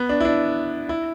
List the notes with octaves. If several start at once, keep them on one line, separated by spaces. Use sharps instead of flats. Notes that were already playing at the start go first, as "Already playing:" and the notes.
Already playing: B3
D4
E4
D4
E4